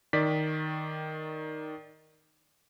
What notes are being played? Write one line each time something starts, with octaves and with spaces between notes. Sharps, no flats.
D#3 D5 B6